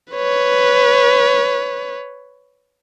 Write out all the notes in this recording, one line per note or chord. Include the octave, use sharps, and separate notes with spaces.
B4 C#5